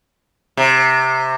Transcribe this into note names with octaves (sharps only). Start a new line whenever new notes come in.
C3